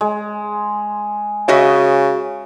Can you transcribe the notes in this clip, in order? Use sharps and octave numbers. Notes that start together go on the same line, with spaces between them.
G#3
C#3 F#4 D#5 E5